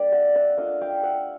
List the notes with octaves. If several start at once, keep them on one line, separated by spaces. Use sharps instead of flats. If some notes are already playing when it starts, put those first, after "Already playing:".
Already playing: G3 A#3 D4 D5
E5 F#5
E5 F#5
A3 D4 F4 D#5 F5
F5 G5
E5 F#5